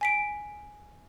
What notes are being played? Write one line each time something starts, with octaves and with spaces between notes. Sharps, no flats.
G#5 B6 D7